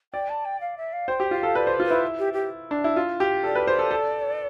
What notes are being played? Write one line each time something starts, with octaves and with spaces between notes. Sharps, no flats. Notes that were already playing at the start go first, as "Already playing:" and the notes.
D5 G5
A5
G5
F5
E5
F5
C5 G5
G4
F4 F5
A4
B4 D5
C5
F4
E4 B4
G4
G4
D4
E4
F4
G4
A4 D5
B4
C5
A4
A4